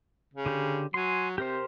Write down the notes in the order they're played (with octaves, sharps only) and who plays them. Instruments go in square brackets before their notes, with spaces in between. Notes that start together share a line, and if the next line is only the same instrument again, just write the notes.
[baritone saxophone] C#3
[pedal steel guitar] D3 G4
[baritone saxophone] F#3 [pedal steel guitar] G#5 C6
[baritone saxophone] C3 [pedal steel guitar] G4 A#4 C5